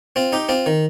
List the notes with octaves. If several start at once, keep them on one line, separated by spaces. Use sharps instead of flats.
C4 F4
D#4 G4
C4 F4
D#3